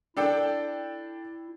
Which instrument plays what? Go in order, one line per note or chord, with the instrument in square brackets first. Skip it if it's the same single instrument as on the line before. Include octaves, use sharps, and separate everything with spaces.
[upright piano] D4 A4 G5 [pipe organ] E4